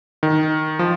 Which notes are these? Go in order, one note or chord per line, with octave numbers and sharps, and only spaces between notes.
D#3
F3